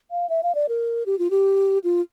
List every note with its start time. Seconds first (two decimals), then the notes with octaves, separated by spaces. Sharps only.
0.11 F5
0.30 E5
0.43 F5
0.55 D5
0.69 A#4
1.06 G4
1.19 F4
1.31 G4
1.84 F4